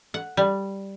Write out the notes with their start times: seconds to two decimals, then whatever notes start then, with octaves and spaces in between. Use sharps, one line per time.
0.14 F#5
0.37 G3